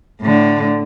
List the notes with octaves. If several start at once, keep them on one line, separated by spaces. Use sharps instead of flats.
A2 D3